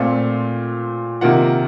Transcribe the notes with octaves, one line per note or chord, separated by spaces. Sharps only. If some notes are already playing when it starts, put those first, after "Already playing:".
Already playing: A#2 A3 C4 F4 F5
C3 D#3 A#3 F4 F#5